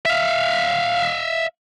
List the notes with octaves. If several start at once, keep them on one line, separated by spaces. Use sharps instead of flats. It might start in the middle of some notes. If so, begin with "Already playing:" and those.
E5 F5